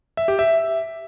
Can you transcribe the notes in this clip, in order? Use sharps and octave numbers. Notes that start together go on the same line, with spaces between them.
E5
G4
E5